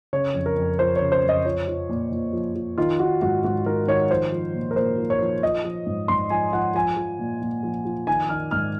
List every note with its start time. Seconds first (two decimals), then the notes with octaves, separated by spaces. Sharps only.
0.13 C#3 C#5
0.34 F2
0.46 A#4
0.56 F2
0.79 F3 C5
0.96 C#5
1.01 C#3
1.12 C5
1.23 F2
1.29 D#5
1.45 F3 C#5
1.68 F3
1.89 A#2
2.12 A#2
2.33 F3
2.56 F3
2.78 D#3 F4
2.99 D#3 F#4
3.22 G#2 F#4
3.44 G#2 F#4
3.65 D#3 A#4
3.87 D#3 C#5
4.10 F3 C5
4.32 F3
4.54 A#2
4.71 A#4
4.76 A#2 C5
4.98 F3
5.10 C#5
5.21 F3
5.43 F3 D#5
5.64 F3
5.87 G#2
6.08 G#2 C6
6.30 F3 G#5
6.53 F3 F#5
6.75 F3 G#5
6.97 F3
7.19 A#2
7.41 A#2
7.63 F3
7.85 F3
8.07 D#3 G#5
8.29 D#3 F6
8.51 G#2 F6